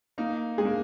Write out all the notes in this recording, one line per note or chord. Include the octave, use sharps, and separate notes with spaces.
A#3 D#4
G#3 G#4
A#3